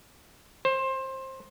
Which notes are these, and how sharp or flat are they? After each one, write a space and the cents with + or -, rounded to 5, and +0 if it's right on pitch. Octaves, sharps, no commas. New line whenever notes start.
C5 +20